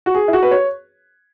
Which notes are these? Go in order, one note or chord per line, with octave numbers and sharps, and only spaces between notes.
F#4
G#4
E4
F#4
B4
C#5